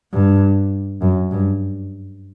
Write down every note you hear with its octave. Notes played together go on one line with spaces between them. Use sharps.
G2
F#2
G2